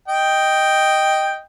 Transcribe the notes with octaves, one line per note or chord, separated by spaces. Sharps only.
D#5 G5